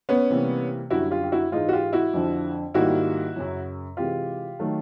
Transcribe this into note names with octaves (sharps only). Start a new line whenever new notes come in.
B3 C#4
C3 E3 G3 A#3
F#2 D3 G3 E4 F#4
F4 G4
G4
E4 F#4
G#2 E3 G#3 D#4 F4
F#4
F4 G4
E4 F#4
F2 D3 F3
G#2 D#3 G3 A#3 E4 F#4
F#2 C#3 F#3
C3 E3 G#3 F4 G4
D#3 F#3 A3